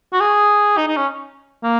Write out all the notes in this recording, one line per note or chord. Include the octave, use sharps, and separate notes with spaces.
F#4
G#4
D#4
D#4
C#4
A#3